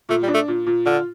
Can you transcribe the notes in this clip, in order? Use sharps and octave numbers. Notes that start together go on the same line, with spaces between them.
A#2 A3
G3
D4
A3
A#2
A#2
D3 F4